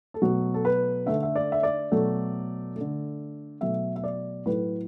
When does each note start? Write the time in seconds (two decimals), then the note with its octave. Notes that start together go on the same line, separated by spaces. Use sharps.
0.14 A4
0.22 B2 F#3 A3 F#4
0.54 A4
0.65 B4
1.06 D3 A3 E5
1.23 E5
1.36 D5
1.52 E5
1.63 D5
1.92 B2 F#3 A3
2.76 A3
2.81 D3
3.61 B2 F#3 A3 E5
3.96 E5
4.04 D5
4.46 A2 F#3 A3 B4